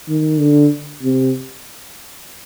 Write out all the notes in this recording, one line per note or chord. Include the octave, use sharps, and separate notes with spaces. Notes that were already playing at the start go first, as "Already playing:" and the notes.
D#3
D3
C3